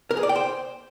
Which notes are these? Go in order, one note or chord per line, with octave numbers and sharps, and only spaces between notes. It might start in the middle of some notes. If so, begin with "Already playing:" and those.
A#4
G#4
D5
G5
C5